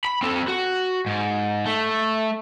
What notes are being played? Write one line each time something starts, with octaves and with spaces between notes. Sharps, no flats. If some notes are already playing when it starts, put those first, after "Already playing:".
B5
C4 A4
F#4
G#2
A3